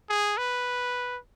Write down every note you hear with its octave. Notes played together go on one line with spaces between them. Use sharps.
G#4
B4